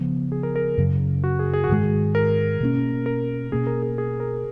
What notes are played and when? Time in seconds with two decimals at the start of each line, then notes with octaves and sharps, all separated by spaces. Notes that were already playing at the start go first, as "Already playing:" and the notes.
Already playing: C#3 F3 B3
0.32 G#4
0.43 A#4
0.56 A#4
0.78 F#2 C#3 F#3
1.24 F#4
1.39 G#4
1.54 G#4
1.64 F#4
1.69 G#2 D#3 G#3 G#4
2.15 A#4
2.61 B2 A#3 C#4
3.06 A#4
3.52 B2 A#3 C#4 G#4
3.67 A#4
3.82 G#4
3.98 G#4
4.20 A#4